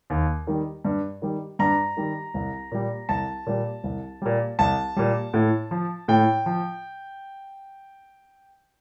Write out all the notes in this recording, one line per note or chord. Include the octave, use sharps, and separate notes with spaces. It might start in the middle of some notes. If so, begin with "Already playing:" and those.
D#2
D#3 G3
G2
D#3 G3
G2 A#5
D#3 G3
C2
A#2 G3
C2 A5
A#2 G3
C2
A#2 G3
C2 A5
A#2 G3
A2
F3
A2 G5
F3